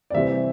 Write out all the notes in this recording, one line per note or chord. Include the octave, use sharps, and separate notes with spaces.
D5
C3 E3 G3 C4 E5